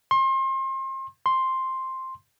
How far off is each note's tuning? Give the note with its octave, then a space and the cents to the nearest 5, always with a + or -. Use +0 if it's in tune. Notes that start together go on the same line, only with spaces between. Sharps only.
C6 +35
C6 +5